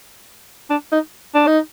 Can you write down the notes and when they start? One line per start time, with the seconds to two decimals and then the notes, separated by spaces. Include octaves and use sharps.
0.70 D4
0.92 D#4
1.34 D4
1.47 D#4